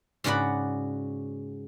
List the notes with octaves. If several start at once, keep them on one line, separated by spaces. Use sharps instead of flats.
G#2 C#3 F#4 D5 F#5 B5